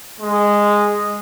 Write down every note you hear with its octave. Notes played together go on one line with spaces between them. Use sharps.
G#3